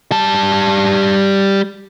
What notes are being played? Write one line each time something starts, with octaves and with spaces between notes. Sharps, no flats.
G3 A5